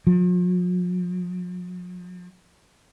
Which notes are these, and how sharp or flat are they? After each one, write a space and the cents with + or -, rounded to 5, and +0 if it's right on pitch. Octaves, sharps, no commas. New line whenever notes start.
F3 +45